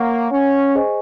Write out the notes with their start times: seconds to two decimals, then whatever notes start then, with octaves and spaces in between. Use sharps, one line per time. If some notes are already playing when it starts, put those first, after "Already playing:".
Already playing: A#3 C#5 F#5 C#6
0.31 C#4
0.75 G#4 C5 D#5 G#5 C#6